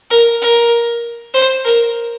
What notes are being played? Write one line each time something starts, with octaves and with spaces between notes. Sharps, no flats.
A#4
A#4
C5
A#4